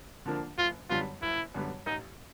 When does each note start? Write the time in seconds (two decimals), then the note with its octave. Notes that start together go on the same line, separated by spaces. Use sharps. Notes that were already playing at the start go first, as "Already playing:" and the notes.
0.26 D3 F3 A#3 D4
0.58 F#1 F4
0.90 F#2 D3 G3 B3 F4
1.22 F#1 E4
1.54 F#2 D3 G3 B3
1.86 A1 D#4